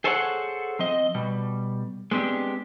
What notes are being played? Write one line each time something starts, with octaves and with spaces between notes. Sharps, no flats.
G#4 A4 C5 C#5 F5 F#5
F3 C4 D#5
B2 G3
G#3 B3 C4 D4 G4